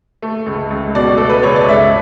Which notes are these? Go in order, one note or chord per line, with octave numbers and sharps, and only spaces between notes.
A3
C#2
C#2
B2 D5
A3 A4
B4
C#2 C#5
D5
C#2 E5